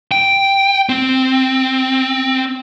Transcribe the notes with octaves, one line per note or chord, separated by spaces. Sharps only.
G5
C4